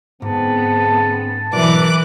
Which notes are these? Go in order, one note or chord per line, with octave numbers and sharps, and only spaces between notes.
G#2 D3 B3 C4 G#4 A5
B1 E3 A#4 B4 D5 D6 F#6